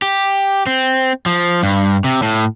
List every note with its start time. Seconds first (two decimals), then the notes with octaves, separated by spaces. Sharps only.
0.02 G4
0.67 C4
1.26 F3
1.63 G2
2.04 C3
2.23 A2